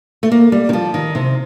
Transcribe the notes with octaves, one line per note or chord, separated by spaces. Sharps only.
A3
A#3
G3
D#3
F3
D#3
C3